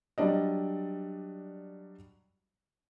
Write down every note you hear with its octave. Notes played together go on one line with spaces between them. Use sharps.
F#3 G3 D4 D5 D#5